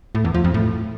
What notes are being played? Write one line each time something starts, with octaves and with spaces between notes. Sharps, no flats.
A2
E2
F3
F2
A2